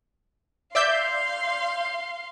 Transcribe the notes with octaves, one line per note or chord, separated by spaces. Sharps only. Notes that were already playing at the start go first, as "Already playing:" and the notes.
D5 E5 F5 C6 G6